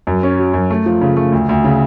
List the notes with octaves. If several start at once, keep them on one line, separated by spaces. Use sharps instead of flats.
F#2
C#4
F#3
F#2
A3
F3
C#3
A3
D2
D2
C#3